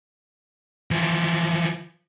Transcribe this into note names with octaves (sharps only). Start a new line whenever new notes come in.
E3 F3